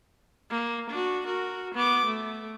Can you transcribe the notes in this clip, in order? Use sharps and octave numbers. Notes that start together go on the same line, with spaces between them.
A#3
D4 F#4
F#4 A#4
B3 D6
A3